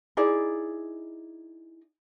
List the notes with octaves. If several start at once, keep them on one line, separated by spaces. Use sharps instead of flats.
D#4 E4 G#4 D5